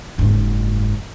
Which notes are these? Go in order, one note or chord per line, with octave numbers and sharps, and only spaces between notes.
F#1 G#2